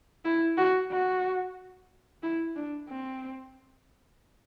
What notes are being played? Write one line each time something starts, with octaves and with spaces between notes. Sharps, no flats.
E4
F#4
F#4
E4
D4
C4